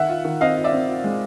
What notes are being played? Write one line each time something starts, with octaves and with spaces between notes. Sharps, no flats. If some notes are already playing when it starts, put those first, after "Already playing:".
Already playing: D#3 E5 F#5
F4
D#3
C4 D#5 F5
F4
D5 E5
C4
F4
G#3